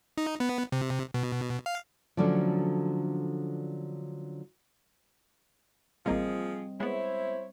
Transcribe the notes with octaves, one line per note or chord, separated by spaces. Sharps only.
D#4
B3
C3
B2
F5
D3 F3 F#3 A3 C#4 D4
A1 F3 G3 A#3 C4 F4 G#4 D#5
G#3 B3 E4 C5 C#5 E5